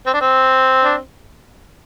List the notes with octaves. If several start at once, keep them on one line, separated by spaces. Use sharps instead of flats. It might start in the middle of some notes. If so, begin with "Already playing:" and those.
C4
D4
C4
D4